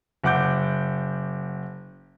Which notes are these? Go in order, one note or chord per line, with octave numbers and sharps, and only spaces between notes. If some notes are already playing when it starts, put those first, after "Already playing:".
F#1 F#5 D6 G6